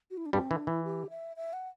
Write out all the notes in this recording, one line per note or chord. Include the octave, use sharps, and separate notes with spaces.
F#4
E4
D4
G2 G3 C4
E3 D4
E3 E4
G4
E5
E5
F#5